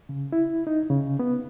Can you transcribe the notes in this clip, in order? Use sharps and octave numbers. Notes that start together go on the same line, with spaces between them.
C#3
E4
D#4
C#3
B3